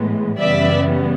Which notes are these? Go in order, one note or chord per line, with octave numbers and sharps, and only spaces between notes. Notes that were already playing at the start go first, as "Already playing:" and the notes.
Already playing: A2 E3 G#3 B3
F#2 C#3 E3 G3 B3 D5 E5